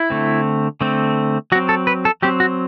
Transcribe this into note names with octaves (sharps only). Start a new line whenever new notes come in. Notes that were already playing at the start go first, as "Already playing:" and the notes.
Already playing: E4
D3 A3 C4
D3 A3 C4
F#3 C4 F#4
A4
B4
A4
F#3 C4 G4
F#4